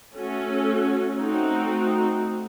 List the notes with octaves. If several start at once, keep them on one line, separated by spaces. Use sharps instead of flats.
A3 C#4 F#4 A4
A3 C4 D#4 F#4